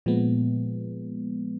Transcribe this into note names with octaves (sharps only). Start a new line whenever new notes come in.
A#2 F3 G#3 B3